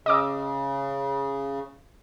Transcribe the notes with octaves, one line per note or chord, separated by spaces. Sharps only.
C#3 D#5 D6 E6